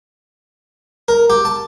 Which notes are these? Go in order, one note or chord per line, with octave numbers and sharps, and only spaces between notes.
A#4
G4
A5